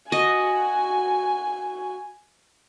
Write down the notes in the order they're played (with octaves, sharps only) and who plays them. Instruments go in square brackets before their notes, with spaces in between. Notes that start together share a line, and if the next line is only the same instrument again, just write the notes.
[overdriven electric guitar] F#4 [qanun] D#5 [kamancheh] G#5